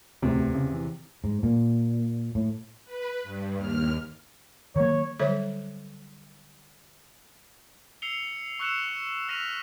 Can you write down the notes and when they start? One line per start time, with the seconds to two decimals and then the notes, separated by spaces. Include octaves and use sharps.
0.22 D1 E2 C3 A3
0.54 C#3
0.72 E3
1.24 G#2
1.43 A#2
2.35 A2
2.85 B4
3.23 G2
3.56 D#2 F6
4.76 D#3 F#3 A#3 C#5
5.19 D3 F#3 G3 C5 C#5 E5
8.02 E6 C7 C#7 F7 G7
8.59 C#6 E6 F#6 C7 C#7 E7
9.28 E6 F6 A#6 B6 D#7 F7